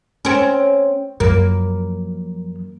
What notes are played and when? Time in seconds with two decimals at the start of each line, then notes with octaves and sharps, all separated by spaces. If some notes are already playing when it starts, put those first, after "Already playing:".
0.25 C4 C#4
1.20 F#2 F3 A#3